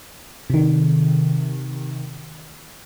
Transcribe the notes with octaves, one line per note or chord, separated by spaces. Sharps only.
C3 D#3